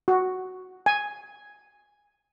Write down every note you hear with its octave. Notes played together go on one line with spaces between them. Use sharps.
F#4
G#5